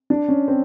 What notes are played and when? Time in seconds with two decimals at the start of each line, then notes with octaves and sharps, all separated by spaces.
0.10 D4
0.28 C#4
0.48 C4